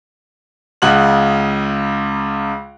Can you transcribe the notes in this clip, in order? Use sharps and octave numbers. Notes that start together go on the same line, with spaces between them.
C#2 C#3 F#5 F#6 F#7